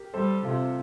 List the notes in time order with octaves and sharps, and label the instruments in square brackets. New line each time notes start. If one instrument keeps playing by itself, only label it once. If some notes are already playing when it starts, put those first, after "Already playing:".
Already playing: [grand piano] G4 A#4
[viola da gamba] G3 [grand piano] A4 C5
[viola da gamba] C3 [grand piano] F4 A4